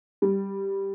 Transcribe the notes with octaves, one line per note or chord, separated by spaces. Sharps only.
G3